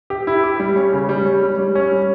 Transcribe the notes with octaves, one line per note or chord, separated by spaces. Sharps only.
G4
E4
G4
G3
C#4
C#3
G3
C#4
G3
G3
C#4
G3